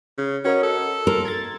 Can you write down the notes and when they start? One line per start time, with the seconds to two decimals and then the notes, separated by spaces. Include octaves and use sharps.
0.18 C#3
0.45 C#4 F#4 A#4 D#5
0.63 A4
1.07 A#4 C6
1.25 G#6 A6